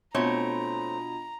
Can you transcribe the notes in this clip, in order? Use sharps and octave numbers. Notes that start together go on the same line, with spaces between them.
B2 A3 C4 D4 F4 C#5 A#5 B5